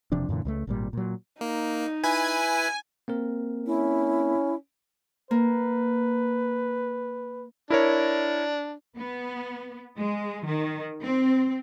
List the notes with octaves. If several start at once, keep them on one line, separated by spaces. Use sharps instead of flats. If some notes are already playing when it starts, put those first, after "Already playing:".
E1 C3 F3 D4
F#2 A#2 D3 E3
C#2 G3 A3
G#1 A#2 G3
A#2 F#3
A#3 D#4
E4 B4 G#5
A#3 C4 A#4
C#4 E4
A#3 B4
D4 E4 A#4 C#5
B3
G#3
D#3
C4